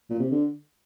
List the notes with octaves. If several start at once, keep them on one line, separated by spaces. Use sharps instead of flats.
A#2
C3
D3